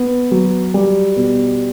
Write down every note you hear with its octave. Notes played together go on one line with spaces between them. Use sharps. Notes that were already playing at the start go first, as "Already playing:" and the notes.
Already playing: B3
F#3
G3
B2